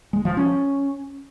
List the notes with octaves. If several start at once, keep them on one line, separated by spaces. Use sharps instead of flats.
G#3
F3
C#4